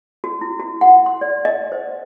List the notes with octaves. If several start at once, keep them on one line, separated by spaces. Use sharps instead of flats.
F#4
E4
F#4
F#5
C6
D5
D#5
C5